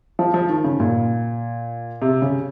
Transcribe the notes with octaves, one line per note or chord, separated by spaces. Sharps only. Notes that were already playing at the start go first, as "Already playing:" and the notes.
F3
F3
D#3
C#3
A#2
C3
C#3